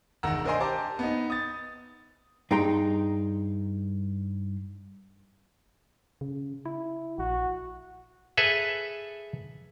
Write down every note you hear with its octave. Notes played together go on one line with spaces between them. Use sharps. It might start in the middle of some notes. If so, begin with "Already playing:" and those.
E1 D#3 F#5 A#5 E6
D4 A#4 C5 D#5 G#5 C6
G4 C5 A5 A#5 D6
B3 D#4
D#6 A6
G2 D#4 G#4 G5 A#5 C6
C#3
E4
A#1 F#4
G#4 A4 B4 E5